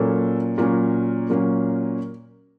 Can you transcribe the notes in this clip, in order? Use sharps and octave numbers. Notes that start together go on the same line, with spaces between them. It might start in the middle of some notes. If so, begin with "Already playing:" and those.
Already playing: A#2 F#3 A#3 C#4 A4
A#2 F#3 A#3 C#4 A#4
A#2 F#3 A#3 C#4